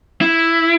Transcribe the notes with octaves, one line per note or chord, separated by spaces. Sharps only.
E4